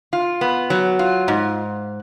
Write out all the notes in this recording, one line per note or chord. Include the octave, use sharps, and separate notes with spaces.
F4
B3
F#3
F4
G#2